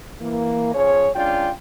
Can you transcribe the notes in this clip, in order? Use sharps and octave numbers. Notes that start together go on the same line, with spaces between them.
E3 A#3
F3 C#4 G#4 C#5
G#3 C#4 D4 F4 D5 G5